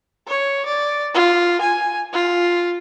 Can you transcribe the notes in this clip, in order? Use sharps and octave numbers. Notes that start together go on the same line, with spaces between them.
C#5
D5
F4
G#5
F4